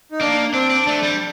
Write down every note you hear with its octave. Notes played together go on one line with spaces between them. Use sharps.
D#4
A#3 D4
C4 D4
D4
A3 D4
G3